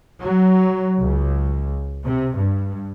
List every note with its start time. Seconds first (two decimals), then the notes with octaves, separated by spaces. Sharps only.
0.21 F#3
1.00 C#2
2.06 C3
2.37 G2